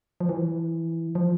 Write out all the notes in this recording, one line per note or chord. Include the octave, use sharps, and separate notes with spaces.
F3
E3
F3